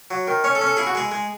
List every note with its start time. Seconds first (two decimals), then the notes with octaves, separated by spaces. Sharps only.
0.11 F#3
0.28 D#3
0.44 C#4 C#5
0.55 A4
0.61 C#4
0.67 A4
0.77 E4 G#4
0.87 F#4
0.95 G#3 G#4
1.11 G#3